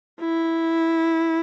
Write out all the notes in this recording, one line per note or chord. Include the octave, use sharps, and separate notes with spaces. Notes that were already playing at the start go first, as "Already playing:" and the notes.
E4